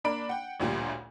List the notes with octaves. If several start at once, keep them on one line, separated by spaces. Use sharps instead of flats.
A#3 D4 D5 B5 D7
F#5 G5
A1 D2 A#2 G3